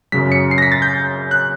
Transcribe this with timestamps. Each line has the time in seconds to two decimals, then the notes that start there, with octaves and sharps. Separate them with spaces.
0.12 F#2 C#3 F#3 B6
0.32 C#7
0.51 C7
0.58 A#6
0.62 B6
0.72 A6
0.82 G6
1.31 F#6